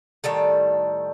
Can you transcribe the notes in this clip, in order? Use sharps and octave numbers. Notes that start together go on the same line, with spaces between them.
A2 D#3 G3 A4